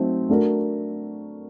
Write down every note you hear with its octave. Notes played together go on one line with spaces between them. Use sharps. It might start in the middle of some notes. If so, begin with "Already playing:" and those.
Already playing: F#3 A3 C4 D#4
A3 D4 F#4 A#4